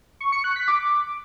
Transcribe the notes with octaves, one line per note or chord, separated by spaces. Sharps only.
C#6
C#7
F#6
B6
D6